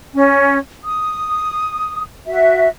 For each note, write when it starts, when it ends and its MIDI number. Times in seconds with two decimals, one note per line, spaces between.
0.12 0.57 61
0.84 2.02 87
2.27 2.67 66
2.27 2.67 76